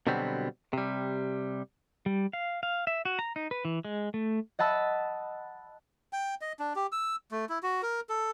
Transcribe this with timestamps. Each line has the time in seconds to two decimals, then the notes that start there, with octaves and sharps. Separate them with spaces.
0.07 B2 D3 F#3 G3 B3 C4
0.73 C3 G3
2.06 G3
2.33 F5
2.63 F5
2.87 E5
3.05 F#4
3.19 A#5
3.36 D#4
3.51 B4
3.65 E3
3.85 G#3
4.14 A3
4.59 D#5 F#5 A5 B5 E6
6.13 G5
6.41 D#5
6.59 D4
6.76 G4
6.92 E6
7.31 A3
7.49 E4
7.63 F#4
7.83 A#4
8.09 A4